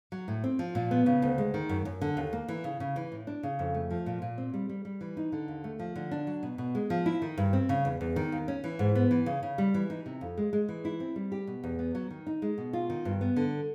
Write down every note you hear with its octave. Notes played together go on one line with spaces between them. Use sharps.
F#3
A2
C4
F3
A#2
B3
C#3
D2
G#3
D#3
F#2
F#2
D3
D#2
A#3
E3
C#3
C#3
E3
A2
D4
C#3
F2
A3
F3
A#2
A#2
C4
G3
G3
G3
E3
D#4
D3
D#2
A3
F3
D3
D4
F#3
B2
B2
G#3
F3
E4
D#3
G2
C4
C#3
E2
E2
D#3
D#2
C#4
E3
G#2
B3
E3
C#3
C#3
G3
E3
D#4
C3
F2
G#3
G#3
E3
E4
C4
G3
G4
B2
E2
B3
F#3
D#3
D#4
G#3
B2
F4
D#3
G2
B3
D3